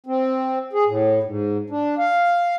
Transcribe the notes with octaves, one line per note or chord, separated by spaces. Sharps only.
C4
G#4
A2
G#2
D4
F5